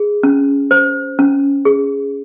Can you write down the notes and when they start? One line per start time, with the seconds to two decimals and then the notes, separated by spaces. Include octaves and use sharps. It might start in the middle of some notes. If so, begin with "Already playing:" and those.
Already playing: G#4
0.23 C#4
0.71 C5
1.19 C#4
1.65 G#4